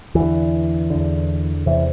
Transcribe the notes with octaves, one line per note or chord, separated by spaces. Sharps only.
E2 D3 E3
E2 D3
E2 C3 E3